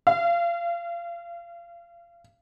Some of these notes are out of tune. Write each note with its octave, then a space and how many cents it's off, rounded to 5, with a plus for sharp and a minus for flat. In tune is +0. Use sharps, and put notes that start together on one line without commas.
F5 -30